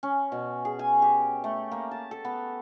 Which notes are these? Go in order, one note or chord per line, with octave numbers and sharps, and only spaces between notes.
C#4
B2
G#4
G#5
G4
A3
A#3
A5
A4
B3